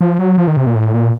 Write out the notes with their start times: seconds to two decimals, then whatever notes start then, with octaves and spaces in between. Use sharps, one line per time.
0.01 F3
0.19 F#3
0.38 F3
0.47 D#3
0.57 C3
0.67 A#2
0.75 A2
0.94 A#2